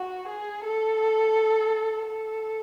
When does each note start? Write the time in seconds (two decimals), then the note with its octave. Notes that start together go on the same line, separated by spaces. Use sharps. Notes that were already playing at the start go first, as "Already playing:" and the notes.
Already playing: F#4
0.28 G#4
0.64 A4
2.06 A4